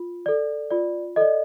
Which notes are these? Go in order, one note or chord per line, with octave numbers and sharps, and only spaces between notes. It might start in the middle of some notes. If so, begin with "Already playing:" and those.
Already playing: F4
A4 D5
F4 D5
A4 D5 D#5